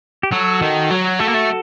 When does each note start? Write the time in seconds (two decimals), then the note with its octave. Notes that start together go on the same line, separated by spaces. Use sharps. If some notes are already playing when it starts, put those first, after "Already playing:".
0.23 G4
0.32 F#3 F#4 A4
0.62 D#3
0.91 F#3
1.20 A3 F#4 A4
1.28 A#3
1.35 A3